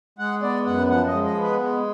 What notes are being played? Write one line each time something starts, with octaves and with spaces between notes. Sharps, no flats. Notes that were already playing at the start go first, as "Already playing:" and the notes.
G#3 F#5
B3 D5
F#2 F#5
F3 F#5
D#5
G#3
D#5
B3
B4
G#3